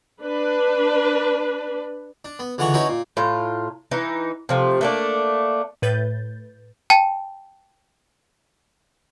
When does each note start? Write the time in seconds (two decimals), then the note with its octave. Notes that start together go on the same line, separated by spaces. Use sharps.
0.22 D4 B4
2.25 D4
2.39 B3
2.58 C#2 D3 E3 F#5 A#5 C#6
2.74 C#4 D#4 E4 F#4 B4 C#5
2.89 A#2
3.17 A2 F4 A#5
3.91 E3 D#4
4.49 C3 F3 A3
4.81 A3 A#3 D4
5.82 A2 B4 G6 A6
6.90 G5 A5